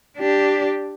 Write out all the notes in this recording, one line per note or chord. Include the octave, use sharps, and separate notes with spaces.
D4 G4